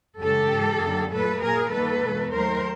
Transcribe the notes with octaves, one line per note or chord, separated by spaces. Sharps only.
F#2 C#3 E3 G#3 G4 A4
G#2 E3 G#3
F#2 D3 F#3 A#3
A#2 F#3 A3 A4 B4
A#2 F#3 A#3 G#4 A#4
D#2 D#3 G3 A#3 A4 B4
E2 B2 G#3
D#2 D#3 F#3 A3 A#4 C5